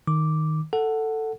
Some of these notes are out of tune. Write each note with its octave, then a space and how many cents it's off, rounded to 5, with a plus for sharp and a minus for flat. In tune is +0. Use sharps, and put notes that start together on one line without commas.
D#3 +0 D6 -5
A4 +10 F#5 +0